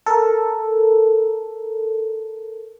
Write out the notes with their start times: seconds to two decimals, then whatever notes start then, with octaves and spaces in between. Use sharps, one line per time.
0.06 A4 A#4